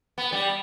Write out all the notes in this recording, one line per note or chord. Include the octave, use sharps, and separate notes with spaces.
B3
G3